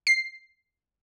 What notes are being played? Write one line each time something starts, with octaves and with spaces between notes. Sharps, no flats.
C7